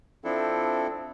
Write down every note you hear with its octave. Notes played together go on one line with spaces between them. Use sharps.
F3 C4 D4 E4 A4